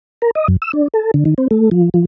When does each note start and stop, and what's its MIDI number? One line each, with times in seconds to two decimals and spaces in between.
0.22 0.31 70
0.35 0.47 75
0.48 0.57 42
0.62 0.72 88
0.73 0.88 62
0.94 1.11 69
1.14 1.24 50
1.25 1.34 51
1.38 1.48 60
1.51 1.70 57
1.71 1.89 53
1.94 2.05 53